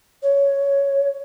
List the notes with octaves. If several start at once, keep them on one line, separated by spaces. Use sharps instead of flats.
C#5